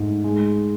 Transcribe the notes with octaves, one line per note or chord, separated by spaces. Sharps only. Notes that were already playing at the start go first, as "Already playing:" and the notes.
Already playing: G#2 A3
G#3